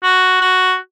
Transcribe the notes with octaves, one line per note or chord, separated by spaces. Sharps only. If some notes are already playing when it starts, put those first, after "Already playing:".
F#4
F#4